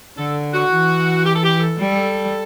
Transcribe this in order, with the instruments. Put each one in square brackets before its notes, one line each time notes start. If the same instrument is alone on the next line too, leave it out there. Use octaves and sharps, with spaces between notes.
[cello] D3 [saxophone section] A4
[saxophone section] F#4
[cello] E3
[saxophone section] G4
A4
G4
A4
[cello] G3